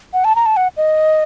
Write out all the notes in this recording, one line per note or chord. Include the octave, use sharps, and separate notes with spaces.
F#5
A5
A#5
A5
F#5
D#5